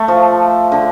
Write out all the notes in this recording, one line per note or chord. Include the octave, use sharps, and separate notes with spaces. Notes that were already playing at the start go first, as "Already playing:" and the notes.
Already playing: A3
F3
D3